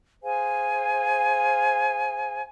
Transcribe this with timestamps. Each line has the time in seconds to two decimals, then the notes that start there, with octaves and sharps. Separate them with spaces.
0.23 G#4 C5 F5 G#5